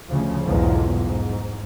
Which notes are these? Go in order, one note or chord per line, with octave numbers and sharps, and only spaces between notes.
D2 C#3 F3
B1 E2 G#2 F3 G#3
G#2